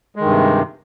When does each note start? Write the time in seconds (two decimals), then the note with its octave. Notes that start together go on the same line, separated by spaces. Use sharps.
0.16 G#3
0.20 D#3
0.25 G2
0.30 C3